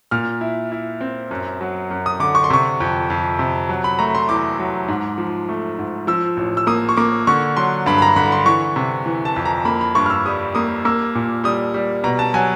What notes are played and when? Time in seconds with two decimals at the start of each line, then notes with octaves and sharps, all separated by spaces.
0.11 A#2 F6
0.41 E4
0.72 E4
1.01 C4
1.31 F#2
1.61 F#3
1.90 F#2
2.06 D#6
2.20 D3 D6
2.35 C#6
2.44 C6
2.50 C3 C#6
2.80 F2
3.10 F2
3.39 C3
3.69 F#3
3.84 B5
3.99 A3 A#5
4.15 C6
4.29 E2 D6
4.59 F#3
4.88 G#2
5.18 F3
5.49 A3
5.79 G#2
6.07 F3 E6
6.37 A1
6.57 E6
6.67 A#3 D#6
6.89 C#6
6.97 A#3 D6
7.27 D3 C#6
7.57 F#3 C6
7.86 G2 B5
7.98 B5
8.02 A#5
8.16 D3 B5
8.32 C6
8.46 E3 C#6
8.76 C3
9.06 E3
9.25 A5
9.36 F2
9.45 A#5
9.65 A#3 B5
9.81 B5
9.95 G2 C#6
10.06 F6
10.10 E6
10.26 G3 D#6
10.55 A#3 D#6
10.85 A#3 E6
11.15 A#2
11.44 G3 D#6
11.74 G3
12.04 B2 A#5
12.19 A5
12.34 F#3 G#5